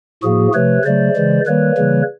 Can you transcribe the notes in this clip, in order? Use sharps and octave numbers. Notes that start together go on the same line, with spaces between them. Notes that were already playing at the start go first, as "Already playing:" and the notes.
A2 F3 A#3 F#4 G#4
C3 F3 A3 B4 C#5
C#3 F#3 A3 C5 D5
C#3 E3 G#3
D#3 G3 A#3 B4 C#5
C#3 E3 G3 A#3